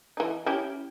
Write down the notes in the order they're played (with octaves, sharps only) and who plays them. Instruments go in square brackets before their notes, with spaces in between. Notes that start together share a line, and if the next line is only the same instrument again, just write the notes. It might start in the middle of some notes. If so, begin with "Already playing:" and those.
[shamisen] E3 D#4
C#4 E4 G4